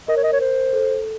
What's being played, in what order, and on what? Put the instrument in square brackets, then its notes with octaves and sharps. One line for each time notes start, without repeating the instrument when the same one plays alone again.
[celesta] A#4 [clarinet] D#5
[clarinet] C#5
D#5
C#5
C5
[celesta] A4